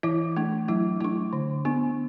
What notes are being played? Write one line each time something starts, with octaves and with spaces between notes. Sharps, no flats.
E3 E4
A3 D4
F#3 E4
A3 D4 E4
D3
B3 D4